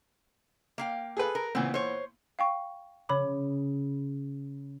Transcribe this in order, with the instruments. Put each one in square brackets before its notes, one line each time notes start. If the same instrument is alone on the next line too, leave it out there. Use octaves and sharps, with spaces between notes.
[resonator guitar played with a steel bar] A#3 F5 G5
[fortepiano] G#4 A4 B4
[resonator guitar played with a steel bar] A#4
[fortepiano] A#2 E3 B3 [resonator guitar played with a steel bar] C#3 C4
[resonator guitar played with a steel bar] C5 C#5
[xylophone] F5 G5 C#6
[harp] C#3 [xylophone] C#5 B5 D6